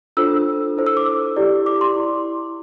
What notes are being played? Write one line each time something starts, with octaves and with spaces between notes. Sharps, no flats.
D4 F4 A4 C5 E6
E4 A4 C5
E6
D6
E4 G4 D5
D6
C6
E4